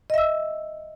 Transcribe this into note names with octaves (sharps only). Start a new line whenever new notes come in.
D#5 E5 E6